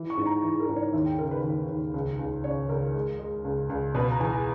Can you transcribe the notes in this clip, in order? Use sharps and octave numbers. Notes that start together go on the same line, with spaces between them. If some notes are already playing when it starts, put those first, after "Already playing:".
Already playing: E3
C#6
G#2
A#5
E3
A#4
G#2
C#5
D#2 E5
G5
C#3 A#4
B4
D#2 B4
D#2
C#2
C#2
C#3 C#5
C#2 A#4
G#3
G#3
C#2
C#2
B2 B4
A#5
E2 G#5